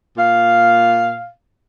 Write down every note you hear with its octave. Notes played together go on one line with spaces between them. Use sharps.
A#2 F5